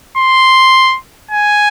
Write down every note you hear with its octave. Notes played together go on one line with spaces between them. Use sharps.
C6
G#5